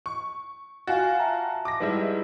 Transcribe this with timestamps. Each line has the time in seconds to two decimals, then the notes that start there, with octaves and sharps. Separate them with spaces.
0.06 C#6
0.87 F4 F#4 F5 G#5 A6
1.20 E5 A5 A#5
1.65 D6 A#6
1.80 G#2 G3 E4 G#4 B4